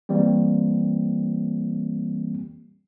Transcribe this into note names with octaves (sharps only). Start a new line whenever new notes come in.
E3 G3 A#3 C4